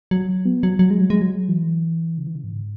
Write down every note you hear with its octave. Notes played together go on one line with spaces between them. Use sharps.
F#3
B3
F#3
F#3
G#3
F#3
G#3
F#3
E3
C#3
E3
C#3
G#2